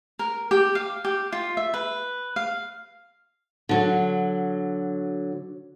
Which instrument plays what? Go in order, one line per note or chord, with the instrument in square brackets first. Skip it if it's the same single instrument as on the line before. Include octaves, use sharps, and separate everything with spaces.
[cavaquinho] A#4
G4
F5
G4
F4
E5
B4
F5
[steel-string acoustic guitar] D3 F#3